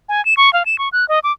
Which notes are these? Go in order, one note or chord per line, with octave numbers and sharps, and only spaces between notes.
G#5
E7
C#6
F5
E7
C#6
F#6
D#5
D6